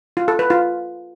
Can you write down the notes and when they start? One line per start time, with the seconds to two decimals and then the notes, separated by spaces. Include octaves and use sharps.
0.17 F4
0.28 A4
0.39 B4
0.50 F4